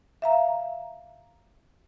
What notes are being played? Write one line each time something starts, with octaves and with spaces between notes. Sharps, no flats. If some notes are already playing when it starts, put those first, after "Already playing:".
E5 F5 A#5